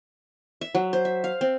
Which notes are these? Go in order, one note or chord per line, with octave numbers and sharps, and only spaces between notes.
E5
F#3
C5
E5
F5
C4